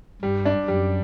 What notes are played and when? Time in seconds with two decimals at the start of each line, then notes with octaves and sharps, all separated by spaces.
0.22 G2 G3
0.45 D4
0.68 F#2 G3